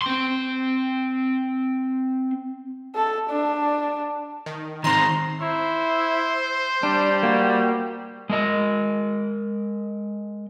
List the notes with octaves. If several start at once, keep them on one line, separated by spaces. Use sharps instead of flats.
C4 C6
A4
D4
D#3
D#3 C4 A#5 C6
E4 C5
G3 D4
A#3 F#4
G#3 A#4 D#5